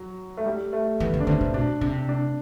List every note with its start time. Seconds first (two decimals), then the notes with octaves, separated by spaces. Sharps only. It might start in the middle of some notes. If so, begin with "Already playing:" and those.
Already playing: F#3
0.37 A3
0.46 G3
0.73 A3
1.00 E3 B3
1.14 D3
1.20 D4
1.27 D3 C4
1.41 C3
1.54 B2 D4
1.81 C3 D4
2.09 D4